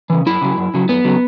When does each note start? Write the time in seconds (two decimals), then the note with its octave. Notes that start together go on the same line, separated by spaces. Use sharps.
0.10 C#3 E3
0.26 F#2 E4
0.41 C#3 F#3
0.57 F#2
0.74 C#3 F#3
0.89 F#2 B3
1.05 C#3 F#3